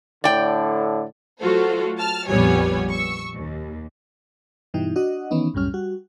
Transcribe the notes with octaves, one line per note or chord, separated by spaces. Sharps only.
A2 D3 D5 G5
F#3 A3 F4 F#4 A4 C5
A5 F6
A#1 F2 G3 B3 C#5 G#5
C#6 E6
D#2
G2 B2 E3 D#4 G5
D4 F#4 D#5 F#5
D#3 E3 B3 C#4 D#4
C2 F#2 A2 G3 C#4 F6
G3 F#4